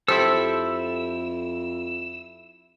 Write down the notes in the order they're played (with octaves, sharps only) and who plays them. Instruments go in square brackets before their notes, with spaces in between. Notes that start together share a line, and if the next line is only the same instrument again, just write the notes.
[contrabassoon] F2 [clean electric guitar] E4 G4 A4 [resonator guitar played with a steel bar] C5 [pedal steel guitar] E6